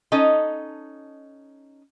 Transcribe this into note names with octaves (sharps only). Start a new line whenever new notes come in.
C#4 D#4 A4 D#5